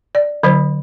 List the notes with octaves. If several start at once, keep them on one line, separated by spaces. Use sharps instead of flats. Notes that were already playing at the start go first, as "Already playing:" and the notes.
D5
D3 F#3 C5